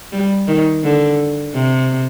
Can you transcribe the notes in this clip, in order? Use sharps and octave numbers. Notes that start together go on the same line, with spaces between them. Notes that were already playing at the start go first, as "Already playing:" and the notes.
G3
D#3
D3
C3